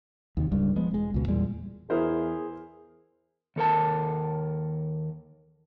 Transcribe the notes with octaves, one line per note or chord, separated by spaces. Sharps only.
D#2 C3 D#3
D1 C#2 G2 G3
F3 G#3 B3
E1 G#3
C#2 B2
E2 A#2 G3 G#3
E2 E4 G#4 A#4 C5
D#2 A4 A#4 A5